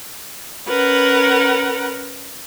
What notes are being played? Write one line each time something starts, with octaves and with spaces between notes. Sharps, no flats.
C#4 A#4 B4 F#5